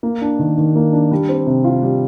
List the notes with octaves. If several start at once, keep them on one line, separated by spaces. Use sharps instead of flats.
A#3
D4
D#3
D#3
A#3
D4
G3
C4
C3
F4
G3